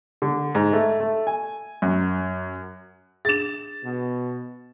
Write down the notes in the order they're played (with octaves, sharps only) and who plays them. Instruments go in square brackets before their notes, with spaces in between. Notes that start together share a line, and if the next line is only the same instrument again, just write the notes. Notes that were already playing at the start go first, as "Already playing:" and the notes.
[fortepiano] D3
G#2
A3
A3
G#5
F#2
[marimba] D4 G#4 [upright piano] A6 E7
[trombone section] B2